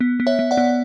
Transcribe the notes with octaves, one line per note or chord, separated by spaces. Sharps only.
B3
B3
C#5 E5
B3
D5 F#5
B3